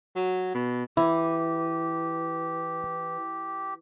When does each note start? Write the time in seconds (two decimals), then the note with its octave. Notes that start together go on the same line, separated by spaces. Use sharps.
0.16 F#3
0.55 B2
0.97 E3 E4 G4